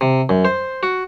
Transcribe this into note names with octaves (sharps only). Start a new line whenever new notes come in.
C3
F#2
C5
F#4